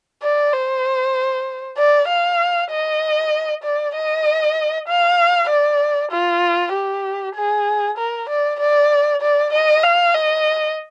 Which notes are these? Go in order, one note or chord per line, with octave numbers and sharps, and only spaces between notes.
D5
C5
D5
F5
D#5
D5
D#5
F5
D5
F4
G4
G#4
A#4
D5
D5
D5
D#5
F5
D#5